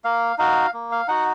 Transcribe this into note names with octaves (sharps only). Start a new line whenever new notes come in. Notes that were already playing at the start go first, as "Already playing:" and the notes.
A#3 F5
D#4 F#4 F5
A#3
F5
D#4 F#4 F#5